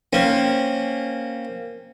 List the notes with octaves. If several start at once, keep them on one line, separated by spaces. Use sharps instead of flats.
A#3 C4 C#4